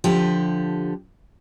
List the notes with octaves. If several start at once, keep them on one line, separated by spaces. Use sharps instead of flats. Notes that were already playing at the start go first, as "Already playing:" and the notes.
D3 F3 G4